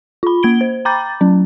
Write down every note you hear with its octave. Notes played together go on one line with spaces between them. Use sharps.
F4 B5
A#3 G#6 D7 G7
C5
G5 A#5 B5 D6 G6 A6
F#3 C#4